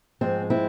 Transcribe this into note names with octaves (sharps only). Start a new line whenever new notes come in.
G#2 F3 G#3 C4
C4 E4